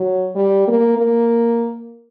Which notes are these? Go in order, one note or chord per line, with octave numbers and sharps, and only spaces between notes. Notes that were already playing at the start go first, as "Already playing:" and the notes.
Already playing: F#3
G3
A#3
A#3